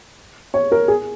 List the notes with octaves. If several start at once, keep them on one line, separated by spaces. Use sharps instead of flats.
C#5
A#4
G#4